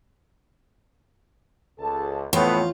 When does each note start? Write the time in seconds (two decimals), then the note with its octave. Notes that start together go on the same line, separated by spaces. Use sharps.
1.80 C#2 A4 A5
2.33 F2 A2 E3 A3 B3 F4 C#5 G5